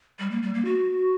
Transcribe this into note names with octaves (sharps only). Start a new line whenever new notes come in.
G3
A#3
G3
A#3
F#4